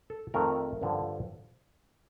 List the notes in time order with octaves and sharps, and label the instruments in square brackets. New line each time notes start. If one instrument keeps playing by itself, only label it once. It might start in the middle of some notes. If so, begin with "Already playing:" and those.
[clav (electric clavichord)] A4
F2 D#3 A3 A#4
G2 D3 F3